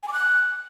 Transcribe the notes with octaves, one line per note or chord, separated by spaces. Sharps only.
G#5
D6
F#6